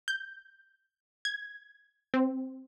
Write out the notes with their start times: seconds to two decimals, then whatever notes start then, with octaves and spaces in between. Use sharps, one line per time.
0.08 G6
1.25 G#6
2.14 C4